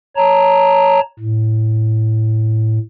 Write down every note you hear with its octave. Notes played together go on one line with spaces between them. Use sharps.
C#5 A5 A#5
A2